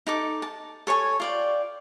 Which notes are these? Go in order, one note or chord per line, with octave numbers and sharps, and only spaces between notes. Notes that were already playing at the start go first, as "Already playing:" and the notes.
D#4 A4 D6
A5
A4 C#5 G#5 C#6
F4 D5 G5